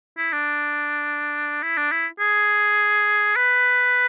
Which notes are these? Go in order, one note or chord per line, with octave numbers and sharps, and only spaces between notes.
E4
D4
E4
D4
E4
G#4
B4